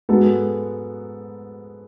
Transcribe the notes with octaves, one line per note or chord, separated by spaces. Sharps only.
G#2 G#3 B3 F#4 A4